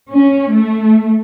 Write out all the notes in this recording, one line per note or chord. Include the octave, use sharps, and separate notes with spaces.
C#4
A3